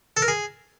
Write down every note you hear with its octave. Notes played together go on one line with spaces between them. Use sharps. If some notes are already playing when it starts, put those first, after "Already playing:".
A4
A#4
G#4